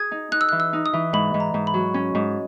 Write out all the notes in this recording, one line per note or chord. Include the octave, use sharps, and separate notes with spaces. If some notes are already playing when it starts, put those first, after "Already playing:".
Already playing: G#4 G#6
D#4
D#4 F#6
E6
E3 F#6
E6
D#4
D#6
E3
G#2 B5
G#2
A#5
G#2
B5
F#3
C#4
G#2